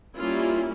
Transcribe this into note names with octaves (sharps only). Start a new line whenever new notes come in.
G3 A#3 C#4 E4 F4